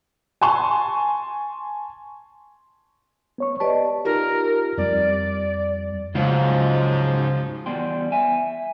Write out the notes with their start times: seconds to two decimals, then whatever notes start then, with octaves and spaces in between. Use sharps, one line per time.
0.41 G#5 A5 C6 C#6
3.38 B3 C#5 C#6
3.60 G4 B4 D5 D#5 A5
4.05 D#4 F4 G4 A#4
4.78 F2 G3 D5
6.15 C#2 G#2 F3 F#3 C#4 F4
7.66 E2 G3 B3 G5 C6
8.12 E5 G#5